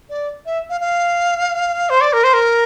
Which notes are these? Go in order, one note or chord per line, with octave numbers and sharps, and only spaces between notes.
D5
E5
F5
F5
C5
D5
A#4
C5
A#4